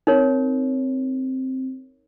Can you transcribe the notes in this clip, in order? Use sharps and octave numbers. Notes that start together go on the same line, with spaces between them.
C4 D#4 A#4 C#5